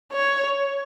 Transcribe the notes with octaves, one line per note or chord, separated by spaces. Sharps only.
C#5